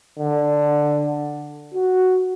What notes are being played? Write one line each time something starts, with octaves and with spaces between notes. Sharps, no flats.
D3
F#4